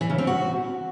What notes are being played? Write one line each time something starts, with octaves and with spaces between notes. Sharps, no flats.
E3
C#3
C4
F#4